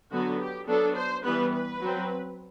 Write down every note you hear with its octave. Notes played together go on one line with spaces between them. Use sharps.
D3 F#3 B3 F#4
G4
F#3 B3 D4 A4
C5
E3 G3 B3 B4
B4
F#3 C4